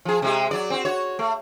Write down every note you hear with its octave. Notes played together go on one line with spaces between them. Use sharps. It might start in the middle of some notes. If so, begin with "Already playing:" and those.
F3 G#4
C3 G#3 G4
F#3 D5
C4 F#4
F#4 C#5
A3